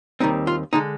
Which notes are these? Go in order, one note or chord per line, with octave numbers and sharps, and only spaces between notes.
D#2 D#3 G3 C4 D#4
F4
D3 G#3 D#4